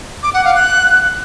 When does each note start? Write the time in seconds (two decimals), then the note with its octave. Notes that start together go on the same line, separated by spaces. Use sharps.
0.23 D6
0.34 F#5
0.44 F5
0.55 F#6